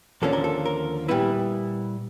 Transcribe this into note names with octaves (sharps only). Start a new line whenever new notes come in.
D#2 D3 F3 A#3 C#4 A4
A#4
A4
A#4
A#2 G3 B3 E4 B4